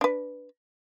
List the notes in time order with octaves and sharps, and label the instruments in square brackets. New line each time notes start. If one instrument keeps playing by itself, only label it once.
[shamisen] D4 B4